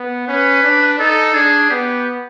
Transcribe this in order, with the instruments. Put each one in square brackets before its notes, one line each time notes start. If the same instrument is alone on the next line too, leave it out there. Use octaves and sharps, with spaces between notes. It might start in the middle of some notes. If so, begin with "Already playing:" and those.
Already playing: [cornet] B3
[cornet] C#4 [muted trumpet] B4
[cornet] D4
[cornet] D#4 [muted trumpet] A4
[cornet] D4 [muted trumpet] G#4
[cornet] B3 [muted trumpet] G4